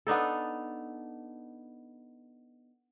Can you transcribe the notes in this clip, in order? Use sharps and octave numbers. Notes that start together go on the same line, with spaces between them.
B3 D4 D#4 A4